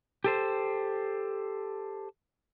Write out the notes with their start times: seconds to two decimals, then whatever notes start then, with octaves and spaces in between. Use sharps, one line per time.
0.24 G4 A4 C5